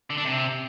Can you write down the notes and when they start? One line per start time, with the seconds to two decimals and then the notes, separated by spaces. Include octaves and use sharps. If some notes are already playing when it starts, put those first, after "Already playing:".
0.10 D3
0.17 D4
0.25 C3